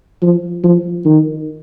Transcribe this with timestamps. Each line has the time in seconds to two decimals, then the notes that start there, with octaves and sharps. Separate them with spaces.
0.23 F3
0.64 F3
1.05 D#3